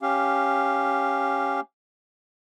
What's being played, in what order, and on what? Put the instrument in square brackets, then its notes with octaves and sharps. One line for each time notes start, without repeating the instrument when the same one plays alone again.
[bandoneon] C#4 G4 F5